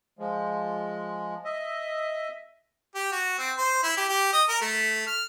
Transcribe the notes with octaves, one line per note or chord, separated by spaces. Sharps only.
F3 G#3
D#5 E5
G4
F#4
C4
C5
E4
G4
G4
D#5
A#4
A3
F6